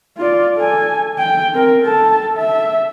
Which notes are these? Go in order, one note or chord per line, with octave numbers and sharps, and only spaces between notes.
F4 D5
A4 G#5
G5
C4 A#4
A4 A5
E5